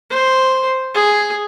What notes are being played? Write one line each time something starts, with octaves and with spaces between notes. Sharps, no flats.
C5
G#4